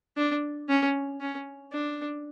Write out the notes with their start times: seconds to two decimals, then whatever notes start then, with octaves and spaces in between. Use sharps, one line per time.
0.17 D4
0.69 C#4
1.21 C#4
1.73 D4